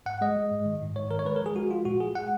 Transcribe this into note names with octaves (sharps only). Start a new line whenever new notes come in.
G#2 F#5
G#3 D#5
G#3
G#2
D#3
G#2
G#2 C#5
D#3 A#4
C#5
G#3 B4
A#4
F3
G#4
G#3 F#4
F3 F4
A#2 F#4
G#3 G#4
G#3 F#5